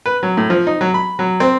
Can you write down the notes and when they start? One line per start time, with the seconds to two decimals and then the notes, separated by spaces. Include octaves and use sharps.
0.06 B4
0.23 F#3
0.37 A2
0.50 F3
0.67 D#4
0.81 F#3
0.94 B5
1.19 F#3
1.40 C4